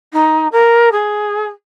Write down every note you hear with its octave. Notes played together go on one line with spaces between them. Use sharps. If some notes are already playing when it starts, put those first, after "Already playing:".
D#4
A#4
G#4